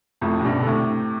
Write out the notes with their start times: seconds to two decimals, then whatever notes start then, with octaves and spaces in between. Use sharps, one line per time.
0.21 F2 A2
0.39 C3
0.45 G2 B2
0.60 D3
0.66 A2 C3